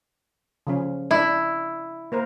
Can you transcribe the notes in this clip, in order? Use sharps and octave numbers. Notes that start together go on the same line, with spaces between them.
C#3 F3 C#4
D4 E4
A#3 A#4 C5